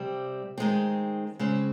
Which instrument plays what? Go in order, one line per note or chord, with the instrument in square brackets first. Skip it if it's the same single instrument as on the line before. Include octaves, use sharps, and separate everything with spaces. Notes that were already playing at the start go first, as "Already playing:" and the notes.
Already playing: [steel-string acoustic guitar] C3 G3 C4
D#3 G#3 C4
C#3 G#3 C4